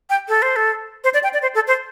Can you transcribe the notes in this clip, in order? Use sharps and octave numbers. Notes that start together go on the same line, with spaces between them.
G5
A4
C5
A4
C5
D5
G5
D5
C5
A4
C5